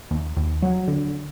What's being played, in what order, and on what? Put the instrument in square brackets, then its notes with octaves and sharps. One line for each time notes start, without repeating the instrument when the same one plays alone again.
[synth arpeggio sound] D#2
D#2
F#3
D3